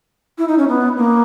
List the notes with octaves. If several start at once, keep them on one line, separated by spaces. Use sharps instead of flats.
E4
D#4
C#4
B3
A#3